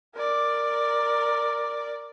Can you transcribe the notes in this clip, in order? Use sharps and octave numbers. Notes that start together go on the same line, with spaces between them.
A#4 D5